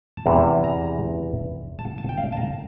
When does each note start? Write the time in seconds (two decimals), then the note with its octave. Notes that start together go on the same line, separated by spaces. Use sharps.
0.17 A5
0.26 E2 C3 E3 A#5
0.64 A#5
1.79 A5
1.98 A5
2.09 G5
2.18 F5
2.32 A5
2.37 A#5